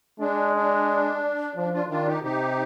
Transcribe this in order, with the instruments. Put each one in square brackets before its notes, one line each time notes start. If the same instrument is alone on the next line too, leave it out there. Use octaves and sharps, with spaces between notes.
[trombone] G#3 [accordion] D4
[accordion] D4
[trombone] F3 [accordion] D4
[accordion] D4 F4
[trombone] D#3 [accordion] D4 F4
[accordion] D#4 G4
[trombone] C3 [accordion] D#4 G4